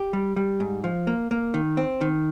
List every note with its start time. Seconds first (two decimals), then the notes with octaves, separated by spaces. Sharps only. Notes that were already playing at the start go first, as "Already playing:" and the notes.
Already playing: G4
0.13 G3
0.36 G3
0.60 G#2
0.84 F3
1.07 A#3
1.31 A#3
1.54 D#3
1.77 C4
2.01 D#3